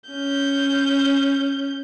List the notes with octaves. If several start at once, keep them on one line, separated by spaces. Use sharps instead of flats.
C#4 G6